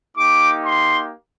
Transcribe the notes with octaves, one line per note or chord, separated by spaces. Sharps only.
A#3 D#4 G4 D6
C6